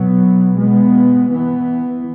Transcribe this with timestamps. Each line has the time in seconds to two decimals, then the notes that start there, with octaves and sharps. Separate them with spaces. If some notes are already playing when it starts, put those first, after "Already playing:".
Already playing: B2 F#3 B3
0.54 B2 G#3 B3
1.30 E3 B3